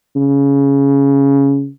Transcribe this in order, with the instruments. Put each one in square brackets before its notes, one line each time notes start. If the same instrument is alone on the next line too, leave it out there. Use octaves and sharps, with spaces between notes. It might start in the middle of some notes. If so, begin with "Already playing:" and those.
[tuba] C#3